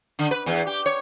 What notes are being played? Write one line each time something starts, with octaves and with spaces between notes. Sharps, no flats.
D3
B4
E2
G4
C#5